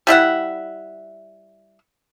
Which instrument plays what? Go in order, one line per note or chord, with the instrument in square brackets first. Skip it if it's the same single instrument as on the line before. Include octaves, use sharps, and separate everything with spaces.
[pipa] G3 E4 E5 F#5